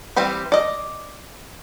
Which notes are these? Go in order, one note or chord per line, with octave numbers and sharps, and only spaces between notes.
E3 G3 C4 G4 B5
D5 D#5